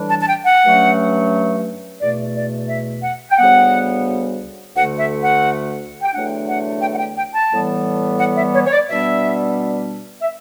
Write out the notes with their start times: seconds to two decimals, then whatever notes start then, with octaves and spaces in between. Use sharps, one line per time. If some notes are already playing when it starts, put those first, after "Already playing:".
Already playing: A2 E3 G3 D4
0.11 A5
0.22 A5
0.28 G5
0.46 F#5
0.63 G2 F#3 A3 C#4
2.00 E2 B2 A3 D5
2.36 D5
2.69 E5
3.03 F#5
3.31 G5
3.38 D2 C#3 G3 B3 F#5
4.76 D2 D3 A3 F#5
4.99 E5
5.22 F#5
6.02 G5
6.14 E2 D3 F#3 A3 D4 F#5
6.49 F#5
6.82 G5
6.95 F#5
7.00 G5
7.18 G5
7.35 A5
7.52 A2 E3 G3 B3
8.21 F#5
8.38 E5
8.55 C#5
8.66 C#5
8.72 D5
8.89 B2 G3 B3 D4 E5
10.22 E5